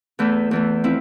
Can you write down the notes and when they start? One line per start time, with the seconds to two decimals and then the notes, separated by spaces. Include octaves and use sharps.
0.19 E2 E3 A3
0.51 E2 E3 A3
0.84 F3 C4 E4